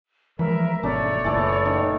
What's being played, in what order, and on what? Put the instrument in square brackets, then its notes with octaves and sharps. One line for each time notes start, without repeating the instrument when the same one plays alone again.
[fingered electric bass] E3 F3 G#3 [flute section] A#4 E5 A#5 [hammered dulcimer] B5
[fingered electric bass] G#1 B2 [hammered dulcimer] A3 D4 [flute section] C#5 D5
[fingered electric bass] F#1 A#2 [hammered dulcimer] E3 A3
[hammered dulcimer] D#3